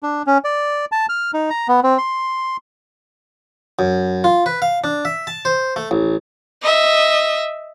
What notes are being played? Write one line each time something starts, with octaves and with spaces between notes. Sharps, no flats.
D4
C#4
D5
A5
F6
D#4
A#5
B3
C4
C6
F#2
F4
B4
F5
D4
E5
A5
C5
A3
A1
D#5 E5